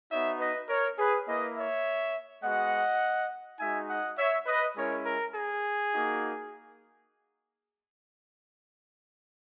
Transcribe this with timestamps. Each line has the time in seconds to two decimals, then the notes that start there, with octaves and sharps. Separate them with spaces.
0.11 B3 D#4 F#4 C#5 E5
0.40 B4 D#5
0.69 A#4 C#5
0.99 G#4 B4
1.28 A#3 E4 B4 D#5
1.57 C#5 E5
2.43 G#3 B3 F#4 D#5 F#5
3.59 G#3 D#4 F#4 E5 G#5
3.89 D#5 F#5
4.17 C#5 E5
4.46 B4 D#5
4.76 G#3 C#4 E4 A#4 C#5
5.05 A#4
5.34 G#4
5.92 A#3 D#4 F#4